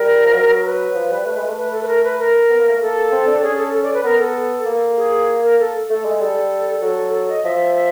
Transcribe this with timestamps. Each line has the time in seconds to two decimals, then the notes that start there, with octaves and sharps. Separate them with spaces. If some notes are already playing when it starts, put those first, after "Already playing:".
Already playing: G3 A#4
0.24 F3
0.34 F#3
0.65 B4
0.95 F3
1.11 G3
1.26 A3
1.37 G#3
1.49 A3
1.57 B4
1.72 A4
1.83 B4
1.87 A#4
2.04 B4
2.19 A#4
2.50 B3
2.59 A#3
2.68 A3
2.79 A#3 A4
3.12 C4
3.27 D4
3.42 C#4 G#4
3.58 A4
3.74 A4
3.83 D5
3.94 B4
4.04 B3 A#4
4.19 A4
4.66 A#3
4.97 G#4
5.43 A#4
5.59 A4
5.89 A3 A4
6.05 G#3
6.21 G3 A4
6.82 F#3 A4
7.13 A4
7.29 D#5
7.44 F3 E5
7.75 E5